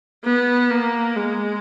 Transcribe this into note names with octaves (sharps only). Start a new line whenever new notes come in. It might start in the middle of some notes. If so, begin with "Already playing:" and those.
B3
A#3
G#3